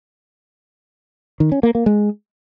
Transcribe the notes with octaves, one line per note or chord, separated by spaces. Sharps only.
D#3
C#4
A#3
A#3
G#3